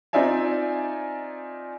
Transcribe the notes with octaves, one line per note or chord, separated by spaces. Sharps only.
C4 D#4 F4 D5 E5 G#5